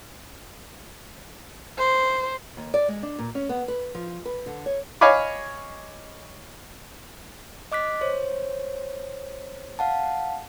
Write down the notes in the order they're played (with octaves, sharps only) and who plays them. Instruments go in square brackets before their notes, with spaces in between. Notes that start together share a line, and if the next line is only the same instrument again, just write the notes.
[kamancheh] C5
[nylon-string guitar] D#2
D5
G#3
D4
A#2
C#4
B3
B4
F3
B4
D3
C#5
[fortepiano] C#5 D#5 F5 G#5 B5 D6
[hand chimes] D#5 D6 F#6 B6
C5 C#5
F5 F#5 A5